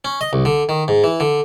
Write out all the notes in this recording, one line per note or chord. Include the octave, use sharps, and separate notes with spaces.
C#4
D#5
C2
D3
D#3
G#2
E3
D3